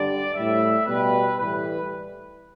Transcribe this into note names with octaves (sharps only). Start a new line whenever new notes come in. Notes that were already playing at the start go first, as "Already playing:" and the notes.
Already playing: G2 D3 G3 D5
A2 G3 E5
B2 G3 B4
A2 E3 G3 B4